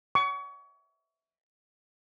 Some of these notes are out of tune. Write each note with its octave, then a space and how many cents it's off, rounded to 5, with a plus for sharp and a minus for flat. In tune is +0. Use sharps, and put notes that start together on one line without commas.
C#6 +30